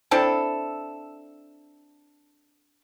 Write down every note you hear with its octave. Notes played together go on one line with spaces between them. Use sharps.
C4 D4 E4 A4